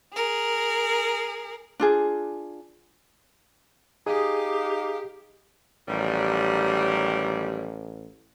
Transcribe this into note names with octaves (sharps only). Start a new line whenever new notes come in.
G#4 A#4
D4 F4 G#4
D#4 G4 G#4 F5 G#5 D6 D#6
A1 D#3 F#3 G3